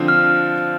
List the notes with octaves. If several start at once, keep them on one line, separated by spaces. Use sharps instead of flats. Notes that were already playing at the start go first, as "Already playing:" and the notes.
Already playing: D3 F3 C4 F4
F6